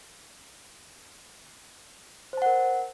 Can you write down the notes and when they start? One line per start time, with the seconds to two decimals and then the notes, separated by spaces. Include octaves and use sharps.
2.33 C5
2.37 A5
2.42 F#5
2.46 A#4